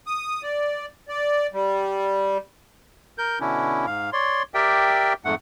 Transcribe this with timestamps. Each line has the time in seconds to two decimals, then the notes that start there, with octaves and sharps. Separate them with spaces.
0.07 D#6
0.43 D5
1.08 D5
1.53 G3
3.18 A#4 G6
3.40 B2 D3 C#4 D4 E4
3.86 G#2 F5
4.13 C#5 D5 C6
4.54 G4 A#4 D5 E5 G5
5.25 F2 G#2 A3 F#5